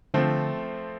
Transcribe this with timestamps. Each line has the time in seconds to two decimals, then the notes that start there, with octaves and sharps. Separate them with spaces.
0.14 D3 F3 A3 C4